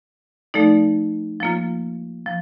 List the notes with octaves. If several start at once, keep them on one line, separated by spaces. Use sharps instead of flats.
F3 A3 D#4 A4 D5
F3 A#3 F4
F3